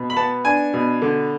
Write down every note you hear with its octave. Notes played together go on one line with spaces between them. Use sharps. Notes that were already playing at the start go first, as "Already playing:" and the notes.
Already playing: B2
B5
B3 A5
D4 G#5
B2
D3